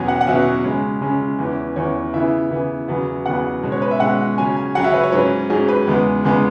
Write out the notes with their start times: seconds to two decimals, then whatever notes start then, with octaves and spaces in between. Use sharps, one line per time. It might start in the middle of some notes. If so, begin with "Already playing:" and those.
Already playing: E2 B2 F#3 C#4 G#5
0.08 F#5
0.21 F#5
0.27 E2 B2 F#3 C#4 E5
0.64 C#3 G#3 C#4
1.01 C#3 G#3 C#4
1.39 E2 E3 C#4
1.76 E2 E3 C#4 C#5
2.13 C#3 E3 B3 E5
2.51 C#3 E3 B3
2.88 E2 C#3 F#3 B3
3.26 E2 C#3 F#3 B3 F#5
3.63 B2 G#3 C#4
3.72 C#5
3.82 B4
3.91 E5
4.00 B2 G#3 C#4 F#5
4.38 C#3 F#3 C#4 G#5
4.57 G#5
4.75 C#3 F#3 C#4 F#5
4.84 E5
4.94 B4
5.03 C#5
5.12 G#2 F#3 C#4 B4
5.50 G#2 F#3 C#4 G#4
5.68 B4
5.87 E2 C#3 G#3 B3
6.24 E2 C#3 G#3 B3